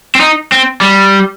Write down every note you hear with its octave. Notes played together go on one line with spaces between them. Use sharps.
C4
D#4
C4
G3